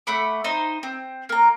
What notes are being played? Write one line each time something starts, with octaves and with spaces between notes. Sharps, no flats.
A3 F#5 B5 D6
D#4 C5
C4
A#3 A#5